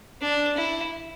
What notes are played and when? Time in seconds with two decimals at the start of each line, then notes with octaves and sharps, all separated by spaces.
0.21 D4
0.57 E4